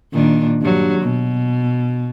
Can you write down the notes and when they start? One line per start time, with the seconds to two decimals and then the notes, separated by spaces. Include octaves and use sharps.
0.12 A#2 D#3 D4
0.62 G2 F#3
1.01 B2